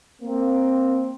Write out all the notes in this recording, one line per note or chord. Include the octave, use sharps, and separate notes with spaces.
A#3 C4